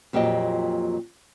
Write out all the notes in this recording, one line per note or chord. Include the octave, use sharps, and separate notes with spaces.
F2 A#2 F#3 G4 D#5